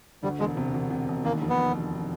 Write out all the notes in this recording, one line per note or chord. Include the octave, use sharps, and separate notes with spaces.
D2 G3
E1 G#3
C3
E1
C3
E1
D#2 A#3
F1
B3